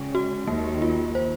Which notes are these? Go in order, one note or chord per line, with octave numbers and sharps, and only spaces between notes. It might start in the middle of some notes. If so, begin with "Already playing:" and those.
Already playing: C#3 G#3
F#4
D#2 D#3 A#3
F4
C5